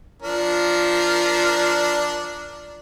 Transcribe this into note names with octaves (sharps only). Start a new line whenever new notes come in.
F3 D4 A#4